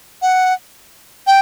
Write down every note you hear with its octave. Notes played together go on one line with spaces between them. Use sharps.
F#5
G5